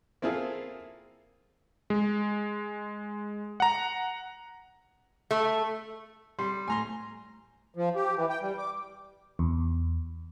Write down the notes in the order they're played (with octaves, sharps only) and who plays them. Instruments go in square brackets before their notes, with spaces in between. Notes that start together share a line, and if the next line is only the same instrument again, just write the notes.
[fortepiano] A#3 C4 E4 F4 G#4 A4
[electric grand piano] G#3
F#5 A#5
[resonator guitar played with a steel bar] A3
[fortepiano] G3 [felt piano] C6
[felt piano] A2 [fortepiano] G#5 A#5 C6
[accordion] F3
G4
E3
G5
G3
D6
[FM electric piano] E2